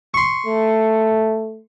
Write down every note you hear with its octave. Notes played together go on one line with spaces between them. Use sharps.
C6 C#6
A3